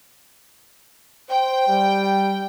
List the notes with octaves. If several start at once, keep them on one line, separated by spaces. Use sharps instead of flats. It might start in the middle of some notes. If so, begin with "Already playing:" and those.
C5 G5
G3